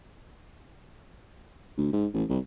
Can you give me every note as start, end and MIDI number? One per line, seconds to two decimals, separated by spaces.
1.78 1.91 38
1.93 2.07 44
2.14 2.24 33
2.29 2.39 36